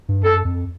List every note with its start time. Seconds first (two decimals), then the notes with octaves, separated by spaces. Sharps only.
0.09 G2
0.23 F#2 A4
0.45 F2